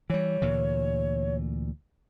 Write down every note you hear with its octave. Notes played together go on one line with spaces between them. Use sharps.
E3 G3 C#5
D2 A#2 E3